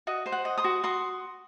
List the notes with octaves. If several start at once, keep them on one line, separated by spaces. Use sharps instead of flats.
F#4 D#5
C5
F#5
D#5
C6 D#6
F#4
F#4 C6 D#6